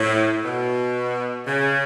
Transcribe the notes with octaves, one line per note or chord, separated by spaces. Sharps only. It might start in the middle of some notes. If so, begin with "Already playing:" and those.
Already playing: A2
B2
C#3